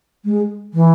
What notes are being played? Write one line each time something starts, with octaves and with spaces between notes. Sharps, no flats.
G#3
E3